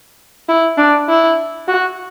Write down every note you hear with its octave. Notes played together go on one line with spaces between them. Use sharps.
E4
D4
E4
F#4